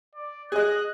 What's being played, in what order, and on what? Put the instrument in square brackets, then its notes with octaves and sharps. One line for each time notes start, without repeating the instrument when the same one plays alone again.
[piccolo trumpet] D5
[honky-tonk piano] G#4 D#5 [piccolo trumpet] F#6